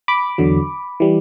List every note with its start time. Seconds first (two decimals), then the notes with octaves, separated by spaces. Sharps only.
0.08 B5 D6
0.38 E2 D3 F#3
1.00 E3 G3